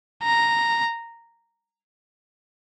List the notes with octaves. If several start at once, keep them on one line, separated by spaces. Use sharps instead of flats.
A#5